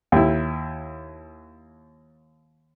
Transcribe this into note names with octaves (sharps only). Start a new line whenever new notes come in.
D#2 E4